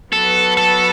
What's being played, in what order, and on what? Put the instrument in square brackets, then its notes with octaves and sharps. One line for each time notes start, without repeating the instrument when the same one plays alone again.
[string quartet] F#3 B3 F#4 B4 [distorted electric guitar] A4
[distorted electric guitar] A4